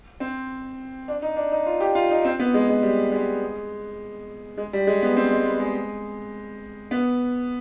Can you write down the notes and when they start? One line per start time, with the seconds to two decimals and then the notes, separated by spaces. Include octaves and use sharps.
0.20 C4
1.08 D4
1.22 D#4
1.36 D4
1.52 D#4
1.66 F4
1.80 G4
1.95 F4
2.10 D#4
2.25 C4
2.39 B3
2.54 G#3
2.69 G#3
2.82 G3
3.12 G#3
4.57 G#3
4.73 G3
4.87 G#3
5.02 B3
5.17 C4
5.32 G#3
5.45 B3
5.60 G#3
6.91 B3